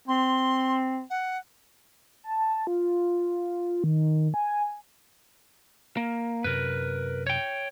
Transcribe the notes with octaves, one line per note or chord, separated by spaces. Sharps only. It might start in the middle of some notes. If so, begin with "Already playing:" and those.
C4 C6
F#5
A5
F4
D#3
G#5
A#3
F#2 C3 A#4 B4
C#5 G5